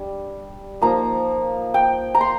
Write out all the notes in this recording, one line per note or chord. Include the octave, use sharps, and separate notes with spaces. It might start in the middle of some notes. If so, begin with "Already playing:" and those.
Already playing: G3 D4
F3 A#3 D#4 A#5
G5
A#5
C6